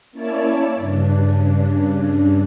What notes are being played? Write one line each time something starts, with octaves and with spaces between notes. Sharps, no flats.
A#3 C#4 E4 C#5 D5 A5
G2 C#3 D4